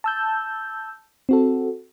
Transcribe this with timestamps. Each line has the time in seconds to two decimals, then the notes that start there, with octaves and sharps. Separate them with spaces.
0.04 A5 E6 G6
1.29 C4 F#4 A4